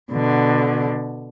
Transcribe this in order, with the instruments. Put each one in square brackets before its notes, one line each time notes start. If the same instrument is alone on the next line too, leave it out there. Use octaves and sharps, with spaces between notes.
[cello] B2 D3